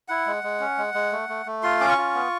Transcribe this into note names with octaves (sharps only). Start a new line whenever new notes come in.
E4 F#5
G#3
G#3
C#4
G#3
G#3
A3
A3
A3
F4 C6
C#4 D6
C#6
F4
B3